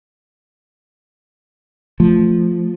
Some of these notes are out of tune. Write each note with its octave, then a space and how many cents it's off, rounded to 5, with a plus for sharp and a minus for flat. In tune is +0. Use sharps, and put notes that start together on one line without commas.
F3 +0 A3 +0